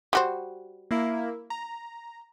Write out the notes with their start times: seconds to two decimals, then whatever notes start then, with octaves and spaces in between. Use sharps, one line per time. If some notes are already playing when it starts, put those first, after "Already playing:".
0.13 G3 F#4 C5
0.91 A#3 E4
1.50 A#5